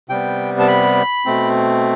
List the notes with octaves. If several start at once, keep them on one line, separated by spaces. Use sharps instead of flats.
C3 G3 B3 G5
A5
B5
B2 A3 C4